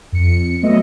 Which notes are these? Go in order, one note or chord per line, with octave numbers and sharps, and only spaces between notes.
F2 C#7
F#3 A3 B3 D#5 E5